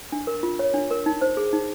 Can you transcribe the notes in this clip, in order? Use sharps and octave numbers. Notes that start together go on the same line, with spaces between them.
D4
A#4
F4
C#5
D4
A#4
D#4
C5
G#4
D#4